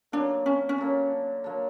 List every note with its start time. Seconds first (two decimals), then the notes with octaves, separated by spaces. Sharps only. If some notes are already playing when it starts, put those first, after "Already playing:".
0.12 D3 F#3 A#3 D4
0.46 C#4
0.69 C#4
0.78 D3 F#3 A#3
1.44 D3 F#3 A#3